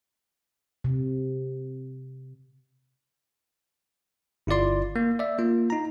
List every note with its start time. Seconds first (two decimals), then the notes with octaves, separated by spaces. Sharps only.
0.84 C3
4.47 G1 E4 F4 D5 C6
4.96 A#3
5.19 D5 E5
5.38 A#3 F4
5.70 D#4 A#5